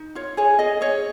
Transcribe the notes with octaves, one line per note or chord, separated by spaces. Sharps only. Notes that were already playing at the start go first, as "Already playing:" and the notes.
Already playing: D#4
F4 C#5
G#4 C#5
G#4 D#5
G#4 C#5